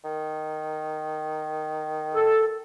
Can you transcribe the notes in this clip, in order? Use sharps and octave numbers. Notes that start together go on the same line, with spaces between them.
D#3
A4